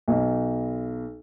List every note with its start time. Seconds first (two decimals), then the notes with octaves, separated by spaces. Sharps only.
0.08 B1